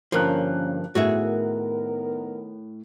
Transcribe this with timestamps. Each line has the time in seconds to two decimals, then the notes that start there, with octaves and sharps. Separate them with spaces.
0.12 G2 D3 F3 A#3 C#4 A#4 A#5 F#6
0.95 A2 D#3 B3 F#4 G#4 A#4 E5